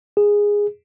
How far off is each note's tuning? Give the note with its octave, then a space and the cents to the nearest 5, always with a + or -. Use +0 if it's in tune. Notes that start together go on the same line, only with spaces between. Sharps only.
G#4 -10